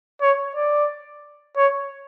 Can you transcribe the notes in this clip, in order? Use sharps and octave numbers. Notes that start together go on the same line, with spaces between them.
C#5
D5
C#5